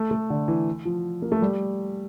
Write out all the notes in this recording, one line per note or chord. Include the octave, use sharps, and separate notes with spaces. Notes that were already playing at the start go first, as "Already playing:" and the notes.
Already playing: A3
A3
D3
E3
F3
A#3
A3
G3